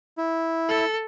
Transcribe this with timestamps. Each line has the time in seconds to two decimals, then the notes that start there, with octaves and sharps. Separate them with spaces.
0.18 E4
0.69 A4